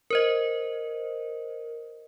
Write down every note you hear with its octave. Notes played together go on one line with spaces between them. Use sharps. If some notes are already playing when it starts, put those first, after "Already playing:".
A#4 C5 D#5